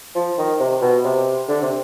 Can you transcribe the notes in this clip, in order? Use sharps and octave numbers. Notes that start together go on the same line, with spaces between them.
F3
D#3
C3
B2
C3
D3
C3